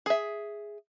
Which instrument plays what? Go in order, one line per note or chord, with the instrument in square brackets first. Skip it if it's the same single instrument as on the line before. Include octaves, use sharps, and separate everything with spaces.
[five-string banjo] G#4 E5